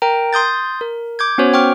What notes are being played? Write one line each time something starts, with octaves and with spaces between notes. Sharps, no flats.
A#4 G5 A#5
C6 D#6 G6 A6
A#4
D6 G6 G#6
B3 C#4 F#4 C5 C#5
G5 C#6 D6 F6